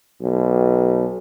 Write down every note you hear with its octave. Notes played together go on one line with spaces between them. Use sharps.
B1